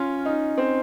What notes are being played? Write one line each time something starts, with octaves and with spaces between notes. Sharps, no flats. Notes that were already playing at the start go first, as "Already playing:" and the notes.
Already playing: C#4 F4
D#4
C4